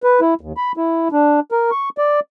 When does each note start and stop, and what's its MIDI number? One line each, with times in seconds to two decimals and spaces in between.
0.03 0.20 71
0.21 0.34 64
0.41 0.53 39
0.57 0.72 83
0.77 1.08 64
1.12 1.40 62
1.52 1.71 70
1.71 1.89 85
1.98 2.20 74